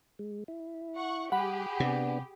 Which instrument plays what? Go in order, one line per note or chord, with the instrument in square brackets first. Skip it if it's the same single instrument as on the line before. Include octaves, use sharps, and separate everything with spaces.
[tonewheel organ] G#3
E4
[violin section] F#5 C#6
[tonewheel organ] G3 [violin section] G4 G#4 [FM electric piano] F#5 B5
[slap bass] C3 [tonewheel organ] B3 D4